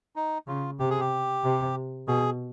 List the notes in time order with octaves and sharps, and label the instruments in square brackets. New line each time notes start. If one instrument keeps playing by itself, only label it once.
[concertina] D#4
[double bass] C#3 [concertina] F4
[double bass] C3 [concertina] G4
[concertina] G#4
G4
[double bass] C3
[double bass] B2 [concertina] G#4